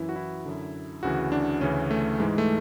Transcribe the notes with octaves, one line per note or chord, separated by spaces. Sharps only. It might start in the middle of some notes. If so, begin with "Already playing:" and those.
Already playing: F#2 E3 E4
F#4
E4
F#2 D3
D2 C#3 E3 F#4
D4
D2 C#3 E3 C#4
A3
G#2 E3 G#3
A3